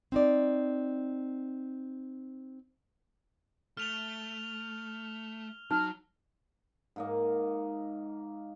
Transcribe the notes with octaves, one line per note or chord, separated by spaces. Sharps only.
C4 D#4 D5
A3 F6 F7 G7
F#3 D#4 F6
G#2 A#3 D#5